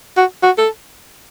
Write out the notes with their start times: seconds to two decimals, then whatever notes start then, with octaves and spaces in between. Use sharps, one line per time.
0.17 F#4
0.43 F#4
0.58 A4